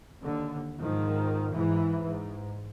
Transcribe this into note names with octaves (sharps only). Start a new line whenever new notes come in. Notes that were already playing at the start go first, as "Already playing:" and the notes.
D#2 D3
G#2 D#3 F3
G#2 E3
G#2